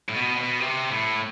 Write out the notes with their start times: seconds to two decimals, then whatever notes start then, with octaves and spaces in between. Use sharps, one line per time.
0.09 A2
0.14 B2
0.37 B2
0.60 C3
0.91 A2